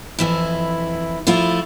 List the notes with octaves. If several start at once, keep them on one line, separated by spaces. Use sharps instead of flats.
F2 E3 E4
F3 A3 E4 F4